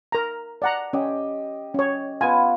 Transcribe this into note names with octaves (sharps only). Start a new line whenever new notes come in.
A#4 A#5
D5 F#5 A#5
C#4 G4 D#5
C#4 C#5
B3 F4 G#5